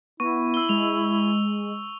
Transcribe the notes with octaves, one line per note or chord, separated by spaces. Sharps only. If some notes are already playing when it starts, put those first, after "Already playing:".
B3 E4 C#6
E6 G7
G#3 F7